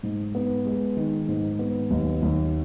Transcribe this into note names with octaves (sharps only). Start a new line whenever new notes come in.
G#2
B3
G#3
D#3
G#2
B3
D#2
D#2